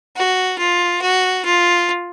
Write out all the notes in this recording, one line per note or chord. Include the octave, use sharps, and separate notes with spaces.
F#4
F4
F#4
F4